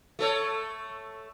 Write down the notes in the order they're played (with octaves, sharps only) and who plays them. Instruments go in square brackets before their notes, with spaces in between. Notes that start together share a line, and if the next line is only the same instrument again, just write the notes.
[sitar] A3 A4 C#5